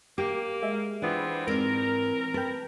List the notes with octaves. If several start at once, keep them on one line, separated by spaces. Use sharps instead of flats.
A#3 G4 A#4 D6
G#3 E5
E3 B3 C4 D4 F4
G#2 C4 A#4 D5
B4 G5 A5